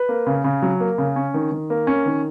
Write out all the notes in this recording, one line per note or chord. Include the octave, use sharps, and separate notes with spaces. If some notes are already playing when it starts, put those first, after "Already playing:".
Already playing: B4
A#3
C#3
C#3
F#3
A#3
C#3
C#4
D#3
D#3
A#3
C#4
D#3